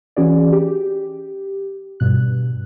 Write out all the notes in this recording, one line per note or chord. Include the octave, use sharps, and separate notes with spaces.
E3 C#4 F#4 G#4 D5
G4
G2 B2 F#6